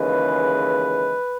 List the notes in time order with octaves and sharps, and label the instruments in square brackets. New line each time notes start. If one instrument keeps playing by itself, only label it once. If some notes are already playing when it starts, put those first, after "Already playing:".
Already playing: [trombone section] D#2 C#3 E3 G#3 B4